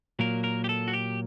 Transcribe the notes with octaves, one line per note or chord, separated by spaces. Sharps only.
A#2 F#3 A#3 A#4
A#4
G4
A4
F#4
G4